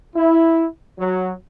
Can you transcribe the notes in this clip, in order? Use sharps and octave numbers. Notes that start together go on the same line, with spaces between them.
E4
F#3